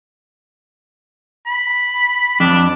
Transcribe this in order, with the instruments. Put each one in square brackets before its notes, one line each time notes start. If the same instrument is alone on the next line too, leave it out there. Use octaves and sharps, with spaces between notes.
[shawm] B5
[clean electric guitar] F2 [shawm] D4